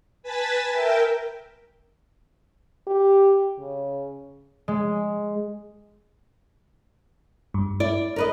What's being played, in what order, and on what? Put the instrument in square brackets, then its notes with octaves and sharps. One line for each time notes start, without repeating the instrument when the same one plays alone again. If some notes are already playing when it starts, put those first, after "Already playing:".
[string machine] B4 G#5 A5 A6 B6
A#4 E5 G5
[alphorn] G4
C#3
[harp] G#3
[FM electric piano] G2
[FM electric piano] E4 [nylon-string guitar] D5
[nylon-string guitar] A#4 B4 D#5